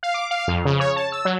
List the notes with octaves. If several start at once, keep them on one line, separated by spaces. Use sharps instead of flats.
F5
D6
F5
F2
C#3
C#5
A5
E6
F#3